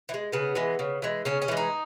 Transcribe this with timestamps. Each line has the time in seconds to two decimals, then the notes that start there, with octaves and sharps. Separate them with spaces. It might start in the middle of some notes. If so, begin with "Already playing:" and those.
0.09 E3
0.14 G#3
0.32 C#3 B3
0.55 E3 G#3
0.79 C#3
1.02 E3 G#3
1.25 C#3 C#4
1.42 C#4
1.48 E3 G#3
1.57 D#4